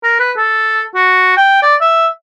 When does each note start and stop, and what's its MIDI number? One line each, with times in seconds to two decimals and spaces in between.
0.04 0.17 70
0.20 0.32 71
0.37 0.84 69
0.95 1.35 66
1.37 1.60 79
1.63 1.75 74
1.81 2.07 76